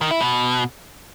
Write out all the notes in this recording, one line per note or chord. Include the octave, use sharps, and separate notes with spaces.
D#3
E4
B2